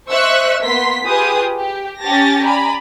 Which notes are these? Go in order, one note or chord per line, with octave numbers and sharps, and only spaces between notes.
C5 D#5 E5 C#6 E6 F#6
A#3 B3 C6 B6
F4 G4 G#4 B4 D#6
G4
C#4 G4 C#5 A5 A6 A#6
D5 G#5 A#5 B5